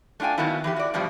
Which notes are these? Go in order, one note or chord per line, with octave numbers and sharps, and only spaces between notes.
A3 D4 F4 G5 G#5
D#3 F#3 A#3 B3 E4
E3 F#3 G4
F#4 D5
G2 B2 F3 G3